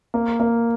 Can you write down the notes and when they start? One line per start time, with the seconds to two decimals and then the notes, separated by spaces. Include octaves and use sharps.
0.14 A#3
0.40 A#3